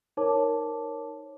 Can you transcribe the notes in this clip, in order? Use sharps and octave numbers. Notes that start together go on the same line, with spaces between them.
D#4 A#4 C5 C#5 A5 D6